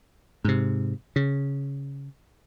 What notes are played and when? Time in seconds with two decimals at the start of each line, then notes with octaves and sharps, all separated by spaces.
0.44 G#2 C3
1.16 C#3